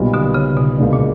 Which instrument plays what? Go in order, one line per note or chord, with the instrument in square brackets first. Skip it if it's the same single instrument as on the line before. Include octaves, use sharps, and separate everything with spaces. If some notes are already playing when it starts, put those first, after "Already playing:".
Already playing: [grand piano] B1 A#2 G3 B3
[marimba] B2 D3
C#3
B2 D3
[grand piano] C#2 B2 A#3 D4
[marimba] A#2